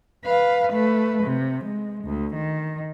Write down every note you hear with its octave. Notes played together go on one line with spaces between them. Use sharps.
B4 F5
A3 B4
C3
G#3
D2
D#3